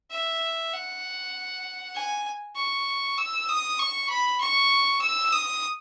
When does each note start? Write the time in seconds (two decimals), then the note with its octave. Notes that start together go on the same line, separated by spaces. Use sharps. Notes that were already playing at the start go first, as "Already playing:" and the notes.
0.11 E5
0.73 F#5
1.95 G#5
2.56 C#6
3.18 E6
3.49 D#6
3.79 C#6
4.09 B5
4.41 C#6
5.01 E6
5.32 D#6